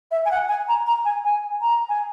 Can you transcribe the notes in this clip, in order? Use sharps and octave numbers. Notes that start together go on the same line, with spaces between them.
E5
G#5
F#5
G#5
A#5
A#5
G#5
G#5
A#5
G#5